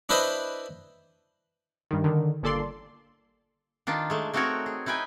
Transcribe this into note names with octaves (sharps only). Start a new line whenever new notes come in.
D4 E4 B4 C5 D#5
G2 D#3
D3 D#3
G1 A#2 A4 D5 C6
D#3 D4 D#4 F4
G#3 A3
A3 C4 D#4 F#4 A#4 C#5
G#4
D#4 E4 B4 G5 G#5